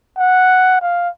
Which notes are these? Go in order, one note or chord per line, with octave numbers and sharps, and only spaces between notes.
F#5
F5